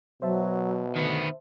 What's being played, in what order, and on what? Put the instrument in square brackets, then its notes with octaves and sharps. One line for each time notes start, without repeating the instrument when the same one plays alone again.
[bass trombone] B2 [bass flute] F#3 [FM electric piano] C5 E5 A5
[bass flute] D3 [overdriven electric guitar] D#3 B3